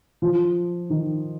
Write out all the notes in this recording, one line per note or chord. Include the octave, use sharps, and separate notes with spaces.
F3
D#3